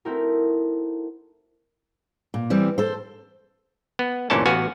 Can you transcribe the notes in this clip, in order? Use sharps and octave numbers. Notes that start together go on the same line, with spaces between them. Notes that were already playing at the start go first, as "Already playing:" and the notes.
A3 C4 D#4 E4 F#4 A#4
A#2
E3 G3 C4
A4 C5
B3
G1 D2 A#2 E3 C#4 A5
A1 B3 F#4 F5 G#5